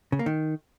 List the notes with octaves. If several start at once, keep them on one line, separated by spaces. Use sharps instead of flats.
C#3
A#3
D#3